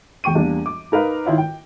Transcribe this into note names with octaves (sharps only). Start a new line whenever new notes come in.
E2 G5 C#6 D#7
E2 G3 A#3 D4
D6
D#4 A#4 B4 F5
D#3 E4 F4 C#5
G5